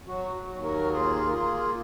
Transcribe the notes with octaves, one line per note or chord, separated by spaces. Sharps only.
F#3 F#4
F#4
D#2
F#4 A#4
A#3 F4 G#4
A#4
A#3 F4 G#4